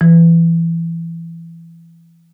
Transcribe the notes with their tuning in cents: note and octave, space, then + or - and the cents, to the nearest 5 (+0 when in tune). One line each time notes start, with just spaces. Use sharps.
E3 +20